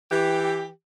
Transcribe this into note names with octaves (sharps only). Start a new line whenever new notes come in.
E3 G4